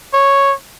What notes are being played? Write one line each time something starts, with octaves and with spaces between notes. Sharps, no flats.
C#5